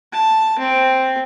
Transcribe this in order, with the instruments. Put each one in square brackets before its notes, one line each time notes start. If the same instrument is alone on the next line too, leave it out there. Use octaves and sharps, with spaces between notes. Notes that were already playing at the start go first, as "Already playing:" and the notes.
[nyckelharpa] A5
C4